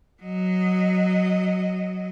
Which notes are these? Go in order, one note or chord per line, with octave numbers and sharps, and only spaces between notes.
F#3 D#5